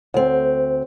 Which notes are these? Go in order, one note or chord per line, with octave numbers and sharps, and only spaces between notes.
D2 C4